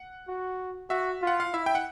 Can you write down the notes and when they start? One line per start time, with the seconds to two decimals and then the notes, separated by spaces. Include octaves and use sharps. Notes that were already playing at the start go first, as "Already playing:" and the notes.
Already playing: F#5
0.28 F#4
0.90 F#4 E5
1.22 F4
1.27 F#5
1.40 F5
1.53 E4 E5
1.66 G5
1.75 F#5